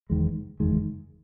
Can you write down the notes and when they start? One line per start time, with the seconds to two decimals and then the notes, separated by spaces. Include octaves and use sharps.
0.10 F#1 E2 D#3 G#3
0.60 F#1 E2 D#3 G#3